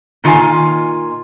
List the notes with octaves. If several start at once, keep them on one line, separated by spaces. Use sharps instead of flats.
A#2 D#3 F4 A#4 G#5